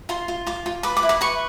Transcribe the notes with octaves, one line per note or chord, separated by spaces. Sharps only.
F4 C6
F4
F4 D6
F4
B4 D6
D6
E4
D6
B4 C#6